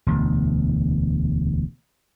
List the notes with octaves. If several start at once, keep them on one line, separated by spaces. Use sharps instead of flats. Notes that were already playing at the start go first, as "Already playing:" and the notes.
E1 D2